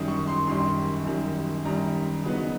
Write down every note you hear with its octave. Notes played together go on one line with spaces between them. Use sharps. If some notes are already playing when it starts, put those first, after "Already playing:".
Already playing: F#2 D#3 G3
C#6
C6
F#2 D#3 G3 C6
F#2 D#3 G3
F#2 D#3 G3 A#5
C#3 F#3 B3 D#4